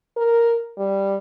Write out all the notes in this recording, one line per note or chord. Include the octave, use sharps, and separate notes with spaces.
A#4
G3